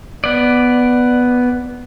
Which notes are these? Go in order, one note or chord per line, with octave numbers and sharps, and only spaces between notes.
B3 D5